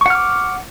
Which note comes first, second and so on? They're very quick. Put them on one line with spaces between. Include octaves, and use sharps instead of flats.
C#6 F#5 F6 D6